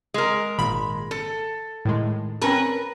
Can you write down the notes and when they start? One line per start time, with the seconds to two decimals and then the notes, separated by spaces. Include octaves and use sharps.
0.14 G#3 A#4
0.59 G#1 A#2 B5
1.11 A4
1.85 A2 D#3 G#3
2.42 C4 C#4 A#4 B4 A5